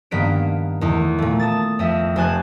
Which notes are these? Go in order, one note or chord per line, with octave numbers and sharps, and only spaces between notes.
G2 D#3 A#3 B3 B6 D7
E2 D#3 A3
A#2 A3
A5 D#6 A6
F2 D#5 E5
F1 C5 G#5 A5 F#6